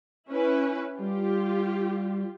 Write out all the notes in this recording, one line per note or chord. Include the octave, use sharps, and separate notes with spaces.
C#4 E4 B4
G3 F4 G4